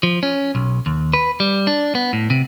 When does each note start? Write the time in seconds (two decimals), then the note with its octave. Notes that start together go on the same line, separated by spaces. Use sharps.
0.03 F3
0.23 C#4
0.55 B1
0.86 D#2
1.13 B4
1.40 G3
1.67 D4
1.95 B3
2.13 A2
2.30 C3